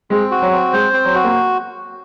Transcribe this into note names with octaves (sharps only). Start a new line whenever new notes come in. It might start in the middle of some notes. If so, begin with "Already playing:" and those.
G#3 C4
F#4
F#3
C4
G#3 C5
C4
F#3
F#4
A#3